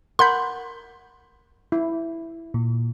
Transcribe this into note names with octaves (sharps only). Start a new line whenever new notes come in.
A#4 F#5 B5 C6 G6
E4
A#2